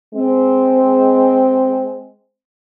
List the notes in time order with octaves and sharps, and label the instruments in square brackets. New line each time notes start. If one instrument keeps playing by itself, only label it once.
[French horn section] G#3 C4